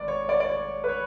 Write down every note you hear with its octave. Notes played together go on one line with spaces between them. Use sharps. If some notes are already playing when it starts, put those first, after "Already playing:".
Already playing: G#1 D5
C#5
D5
D5
C#5
B4
C#5